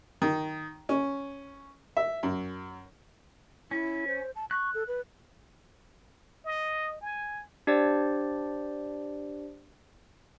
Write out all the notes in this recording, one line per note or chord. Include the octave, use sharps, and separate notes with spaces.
D#3
C#4
E5
F#2
C#4 E4
C5
A5
C#6 F#6
A4
B4
D#5
G#5
D4 G4 C5 D5